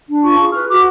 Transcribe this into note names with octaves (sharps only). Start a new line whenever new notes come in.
D4
F4 C#6
G#4
B4 F6
F#4 D6